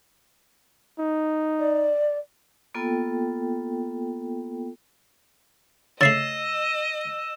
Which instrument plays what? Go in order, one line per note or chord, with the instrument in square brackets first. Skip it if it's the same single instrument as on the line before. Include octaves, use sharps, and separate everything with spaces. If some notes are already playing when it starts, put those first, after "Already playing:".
[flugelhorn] D#4
[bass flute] D5
[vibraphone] A#3 B3 F4 A4 G5
[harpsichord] C#3 A3 [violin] D#5 [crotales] E6 E7 [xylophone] A6 C7